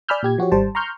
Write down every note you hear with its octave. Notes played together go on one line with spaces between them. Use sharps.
D5 G#5 B5 E6 F6 G6
A#2 G4 G#6
F3 F#4 G4 C#5
G#1 G3 C5 A5
A#5 C6 C#6 F6 G6